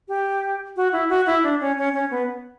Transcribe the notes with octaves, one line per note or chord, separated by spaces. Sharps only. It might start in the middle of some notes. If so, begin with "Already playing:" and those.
G4
F#4
E4
F#4
E4
D4
C#4
C#4
C#4
B3